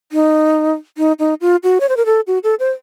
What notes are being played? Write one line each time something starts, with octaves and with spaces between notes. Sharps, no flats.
D#4
D#4
D#4
F4
F#4
C#5
C5
A#4
A4
F#4
A4
C5